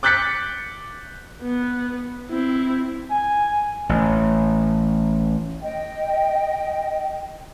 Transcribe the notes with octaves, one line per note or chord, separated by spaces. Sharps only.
D6 F#6 G6 A6 B6 C#7
B3
C4 E4
G#5
A1
D#5 G5